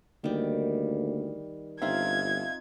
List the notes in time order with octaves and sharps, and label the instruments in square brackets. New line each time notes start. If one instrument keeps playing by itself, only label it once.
[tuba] D2 [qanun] D#3 G3 [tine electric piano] A#3
[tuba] G1 [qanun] C4 D#4 F4 [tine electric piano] E5 F5 [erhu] G#6